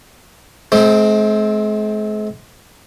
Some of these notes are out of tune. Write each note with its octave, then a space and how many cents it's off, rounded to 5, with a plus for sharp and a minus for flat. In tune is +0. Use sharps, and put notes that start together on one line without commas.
G#3 +45 C4 +0